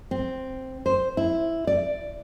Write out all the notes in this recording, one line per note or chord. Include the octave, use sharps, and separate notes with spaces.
C4
C5
E4
D5